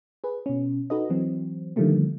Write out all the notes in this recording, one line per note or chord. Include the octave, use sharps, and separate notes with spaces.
G#4 B4
B2 C#4
D#4 F#4 A4 B4 D#5
E3 F#3 C4
D3 D#3 F3 G3 A3 A#3